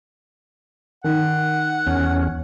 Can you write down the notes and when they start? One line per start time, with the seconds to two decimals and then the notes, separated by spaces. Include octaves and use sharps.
1.04 D#3 F#5
1.87 E2 C#4